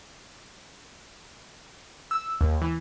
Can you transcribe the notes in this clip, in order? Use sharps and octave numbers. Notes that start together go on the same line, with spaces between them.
E6
D#2
E3